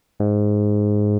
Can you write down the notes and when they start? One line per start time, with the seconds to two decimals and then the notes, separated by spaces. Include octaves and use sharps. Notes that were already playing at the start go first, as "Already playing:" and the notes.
0.20 G#2